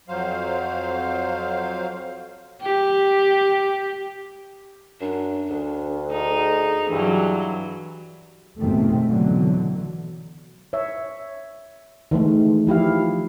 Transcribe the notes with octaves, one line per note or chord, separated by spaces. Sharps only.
F2 F#3 C5 F5
G4
F#2 D4
D2
D#4 G#4
G2 E3 F#3
F1 G#2 B2 D#3 A3 C4
B2 D3 E3 F#3
C#5 E5
D#3 E3 G#3 A3
F3 E4 G4 F5